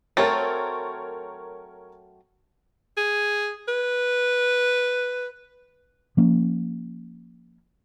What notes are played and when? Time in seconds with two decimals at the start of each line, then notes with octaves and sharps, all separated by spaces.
0.17 F#3 A3 C4 A#4 C#5 A6
2.97 G#4
3.68 B4
6.17 F3 A#3 C#4